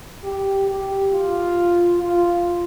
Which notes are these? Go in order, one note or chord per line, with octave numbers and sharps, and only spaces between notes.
G4
G4
F4
F4